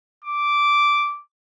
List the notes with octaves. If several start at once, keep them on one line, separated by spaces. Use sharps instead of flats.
D6